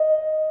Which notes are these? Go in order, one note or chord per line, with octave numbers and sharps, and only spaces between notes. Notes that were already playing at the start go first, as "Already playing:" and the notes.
Already playing: D#5